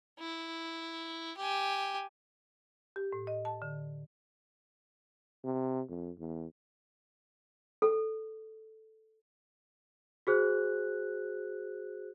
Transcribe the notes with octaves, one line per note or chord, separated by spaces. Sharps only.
E4
G4 G#5
G4
A2
D#5
A5
D3
C3
F2
E2
A4
F#4 G#4 C5 F#6